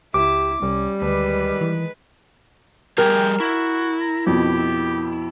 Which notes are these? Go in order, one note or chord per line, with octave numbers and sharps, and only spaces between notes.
C#2 E4 G4 D6
C2 G3 C#4
D2 D#3 G#3 B4
E3
G3 G4 G#4 A#4 G5
E4 F#4
A#5
F2 B2 G4